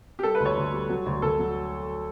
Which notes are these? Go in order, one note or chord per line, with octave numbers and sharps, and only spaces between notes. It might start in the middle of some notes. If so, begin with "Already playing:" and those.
G4
G3 A4
B4
D2
C#5
D2
G3
F#3
D2
D2 A4
F#3